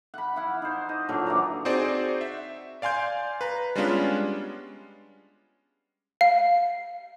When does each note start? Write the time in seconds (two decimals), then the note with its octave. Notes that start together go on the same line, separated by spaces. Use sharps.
0.14 F#5 B5
0.36 E4 F5 F#5
0.62 D#4 C5
0.89 D#5
1.09 A#2 D3 F#3
1.27 E3 D5 A#5
1.65 C4 D#4 F#4 G#4 C5 D5
2.21 E5
2.82 D5 F5 G#5 C6 G6
3.41 B4 A#5
3.75 G3 G#3 B3 C#4 D4 F4
6.21 F5